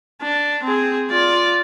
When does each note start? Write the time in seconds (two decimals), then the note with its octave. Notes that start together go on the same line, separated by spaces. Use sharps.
0.22 D4
0.63 C4 G#4
1.10 F4 D5